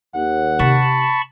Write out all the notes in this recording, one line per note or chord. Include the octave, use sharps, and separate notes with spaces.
D#2 F#5
C3 D#4 A5 B5 C#6